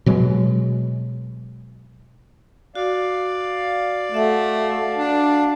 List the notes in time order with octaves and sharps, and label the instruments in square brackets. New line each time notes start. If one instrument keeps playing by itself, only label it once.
[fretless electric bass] B2 F#3 G#3
[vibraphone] F#4 [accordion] D5 F5
[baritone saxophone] A3 [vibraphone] F#4 E5 F#5
[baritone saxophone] D4